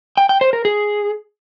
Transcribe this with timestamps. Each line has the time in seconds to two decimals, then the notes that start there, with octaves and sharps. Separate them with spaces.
0.17 G5
0.29 G5
0.41 C5
0.53 A#4
0.65 G#4